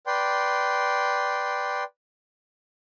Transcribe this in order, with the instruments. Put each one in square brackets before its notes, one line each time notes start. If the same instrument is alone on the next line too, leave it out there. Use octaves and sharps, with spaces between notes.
[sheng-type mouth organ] B4 D5 G5 C6